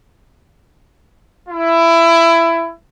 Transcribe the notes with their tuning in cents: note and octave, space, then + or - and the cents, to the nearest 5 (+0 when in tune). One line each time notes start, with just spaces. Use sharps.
E4 +20